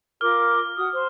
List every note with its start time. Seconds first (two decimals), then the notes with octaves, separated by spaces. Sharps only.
0.21 F4 A#4 D6 F6
0.77 F#4 D#6
0.92 C5